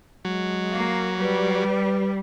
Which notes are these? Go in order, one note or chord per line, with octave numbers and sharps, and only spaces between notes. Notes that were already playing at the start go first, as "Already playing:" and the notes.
F#3 G#3
A#3
G3 B4